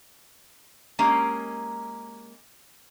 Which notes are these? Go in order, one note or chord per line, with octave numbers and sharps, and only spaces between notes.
G#3 A#3 C#4 G4